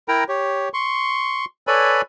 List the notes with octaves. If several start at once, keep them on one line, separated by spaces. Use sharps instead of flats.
E4 A#4 G5 A#5
G4 C#5
C6 C#6
A4 B4 C#5 D5 G#5 B5